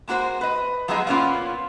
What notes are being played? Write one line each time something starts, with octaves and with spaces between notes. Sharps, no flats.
G#3 A#3 F#4 A4 C5
B4 D#5
F3 F#3 G#3 B3 G#4 D#5
A#2 A#3 B3 C#4 E4 F4